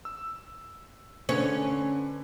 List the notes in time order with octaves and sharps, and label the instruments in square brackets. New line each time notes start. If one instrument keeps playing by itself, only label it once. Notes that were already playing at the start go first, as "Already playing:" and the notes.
[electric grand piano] E6
[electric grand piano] D3 B4 [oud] C#4